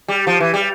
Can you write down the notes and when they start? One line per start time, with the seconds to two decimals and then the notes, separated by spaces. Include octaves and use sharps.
0.08 G3
0.27 F3
0.40 E3
0.54 G3